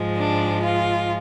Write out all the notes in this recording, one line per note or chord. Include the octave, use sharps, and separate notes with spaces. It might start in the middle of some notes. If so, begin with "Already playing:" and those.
Already playing: G#2 F3 G#3
D4
F4